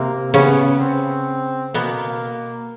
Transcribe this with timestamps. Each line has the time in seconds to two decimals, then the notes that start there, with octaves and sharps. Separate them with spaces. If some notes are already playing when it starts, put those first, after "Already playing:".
Already playing: C3 A#3 C4
0.34 C#3 B3 C#4
0.80 C4
1.74 B2 A#3 B3